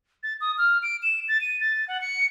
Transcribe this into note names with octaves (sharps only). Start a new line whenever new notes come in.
A6
D#6
F6
D7
E7
A6
D#7
A6
F#5
C#7